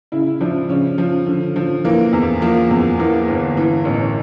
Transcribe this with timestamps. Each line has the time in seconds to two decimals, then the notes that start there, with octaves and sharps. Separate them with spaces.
0.12 C#3 E4
0.41 F3 D4
0.69 C#3 C#4
0.98 F3
1.26 D3
1.56 F3
1.85 E3 A#3
2.13 E2
2.42 F3 A#3
2.71 E2
2.99 E3 A#3
3.28 G1
3.57 E3
3.85 A1